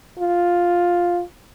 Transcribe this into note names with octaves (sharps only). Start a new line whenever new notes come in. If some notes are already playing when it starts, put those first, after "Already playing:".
F4